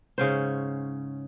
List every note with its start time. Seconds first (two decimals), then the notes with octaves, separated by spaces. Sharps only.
0.18 G#2 C#3 C#4 C5